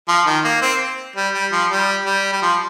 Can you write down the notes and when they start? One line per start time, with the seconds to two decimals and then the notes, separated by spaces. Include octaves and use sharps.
0.08 F3
0.26 D#3
0.45 A#3
0.62 C4
1.16 G3
1.34 G3
1.52 F3
1.70 G3
2.06 G3
2.33 G3
2.42 F3